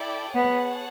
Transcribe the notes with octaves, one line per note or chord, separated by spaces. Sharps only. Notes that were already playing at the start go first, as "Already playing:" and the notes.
Already playing: E4 A4 D5 G5
B3 G#4 C#5 F#5 A5